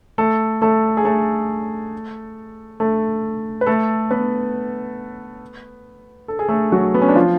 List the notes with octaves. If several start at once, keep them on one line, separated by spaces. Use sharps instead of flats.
A3 A4
A3 A4
G#4
A3 A4
A3 A4
B4
A3 A4
B3 B4
A4
G#4
A3 A4
F#3 F#4
B3
C#4
D4
F3 F4